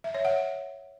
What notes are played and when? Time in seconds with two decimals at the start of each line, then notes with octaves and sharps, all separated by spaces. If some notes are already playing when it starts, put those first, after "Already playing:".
0.04 E5
0.14 C#5
0.25 F#5